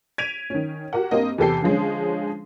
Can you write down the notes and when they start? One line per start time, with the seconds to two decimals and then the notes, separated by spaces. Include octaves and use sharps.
0.18 G#6 B6 D7 D#7 F7
0.50 D#3 C#4
0.93 F#4 G4 A#4 F#5
1.11 G2 A#3 C4 A#4 D#5
1.38 E2 C3 G4 A4 G5 C7
1.62 D3 F3 G#3 C#4